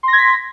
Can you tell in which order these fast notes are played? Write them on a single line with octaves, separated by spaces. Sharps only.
C6 A#6 G#6 B6